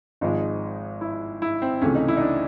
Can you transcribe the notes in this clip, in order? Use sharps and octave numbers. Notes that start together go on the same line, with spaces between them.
G#1 G#2 F3 G#3 D#4
E4
E4
C4
C#2 C3 E3 A3 C#4
D#4
E4
D#4
D4